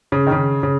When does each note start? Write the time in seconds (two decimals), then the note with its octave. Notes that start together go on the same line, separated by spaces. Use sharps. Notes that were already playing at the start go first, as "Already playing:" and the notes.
0.12 C#3
0.27 D#3
0.32 C#3
0.63 C#3